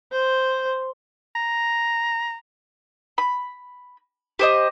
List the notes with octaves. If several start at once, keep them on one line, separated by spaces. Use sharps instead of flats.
C5
A#5
B5
G4 C5 D#5